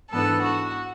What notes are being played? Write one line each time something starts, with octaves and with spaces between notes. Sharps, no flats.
G#2 E3 B3 D4 A4
F#4